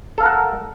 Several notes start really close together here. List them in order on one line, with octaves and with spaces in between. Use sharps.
A4 F5 A#4 F#5